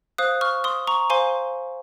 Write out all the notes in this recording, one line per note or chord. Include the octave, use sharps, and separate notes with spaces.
C5 F5 D#6 F#6
C#6 F6
C6 D#6
A#5 C#6
C5 F5 G#5 C6